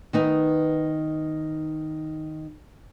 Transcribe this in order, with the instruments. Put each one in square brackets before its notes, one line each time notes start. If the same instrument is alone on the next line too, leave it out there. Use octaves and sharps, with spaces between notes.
[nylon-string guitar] D#3 B3 D#4